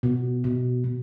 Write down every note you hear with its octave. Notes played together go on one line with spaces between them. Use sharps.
B2
B2
B2